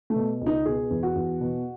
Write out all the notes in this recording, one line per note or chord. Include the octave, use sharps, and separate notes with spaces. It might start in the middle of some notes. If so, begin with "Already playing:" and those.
A3
B2
C#2
D#4
B2 G#4
E2
F#4
E2
B2